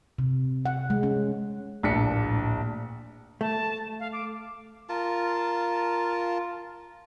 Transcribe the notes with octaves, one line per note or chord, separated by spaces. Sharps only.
C3
F#5
G#3
C#4
D1 A#1 D4 D5 B6 C#7
A3 A5
F5
D6
F4 A#4 A5